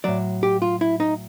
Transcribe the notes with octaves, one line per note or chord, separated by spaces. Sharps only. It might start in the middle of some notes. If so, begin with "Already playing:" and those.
A2 F#3 D5
G4
F4
E4
D#4